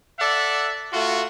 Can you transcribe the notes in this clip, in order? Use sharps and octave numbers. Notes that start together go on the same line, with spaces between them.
A4 D5 E5 F#5
A3 F4 F#4